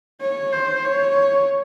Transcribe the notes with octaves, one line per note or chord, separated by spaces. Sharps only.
C#5
C5
C#5